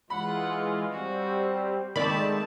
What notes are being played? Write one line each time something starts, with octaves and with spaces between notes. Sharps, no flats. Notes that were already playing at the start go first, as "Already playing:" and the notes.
E3 G#3 F4 F#5 B5
G3 C4 F#4
D#3 G#3 A3 C4 D5 A5 B5